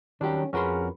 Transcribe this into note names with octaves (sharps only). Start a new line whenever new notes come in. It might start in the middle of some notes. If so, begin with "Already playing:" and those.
D#3 F#3 G3 C#4 D4 G4
F2 C#4 F#4 G#4 A#4 B4 C6